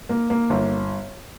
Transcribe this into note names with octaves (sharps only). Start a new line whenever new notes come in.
A#3
A#3
G1